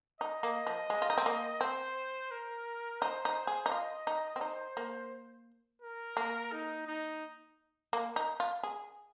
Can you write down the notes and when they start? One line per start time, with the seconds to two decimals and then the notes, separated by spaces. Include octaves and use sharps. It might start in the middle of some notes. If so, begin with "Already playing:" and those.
0.20 D#4 D#5
0.43 A#3
0.67 F3
0.90 G#3
1.02 F4
1.10 D#4
1.18 C4
1.26 A#3
1.61 C4 C5
2.31 A#4
3.01 D#4 C5
3.25 D#4
3.47 G#4
3.66 D#4
3.71 F4 D#5
4.07 D#4
4.36 C4
4.41 D#4 C5
4.77 A#3
5.81 A#4
6.17 A#3
6.52 D#4
6.87 D#4
7.93 A#3
8.16 D#4
8.40 F4
8.63 G#4